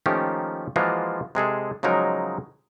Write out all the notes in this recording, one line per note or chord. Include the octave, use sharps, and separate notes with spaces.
D#3 F3 A3 A#3 C#4 G4
E3 F3 G#3 A#3 F4 F#4
C3 G#3 G#4 A4
C#3 F3 F#3 G#3 D#4 A#4